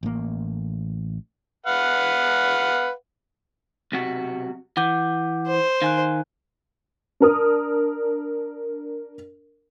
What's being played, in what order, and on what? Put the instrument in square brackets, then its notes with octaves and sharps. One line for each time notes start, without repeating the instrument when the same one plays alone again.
[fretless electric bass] A1 A#3
[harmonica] B4 F5 F#5
[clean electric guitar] B1 C3 F#4
[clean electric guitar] E3 [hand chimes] F#5 D6 G6
[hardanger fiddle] C5
[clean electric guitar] D#3 [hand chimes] F5 G#5 F#6
[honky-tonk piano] D4 A#4 D#6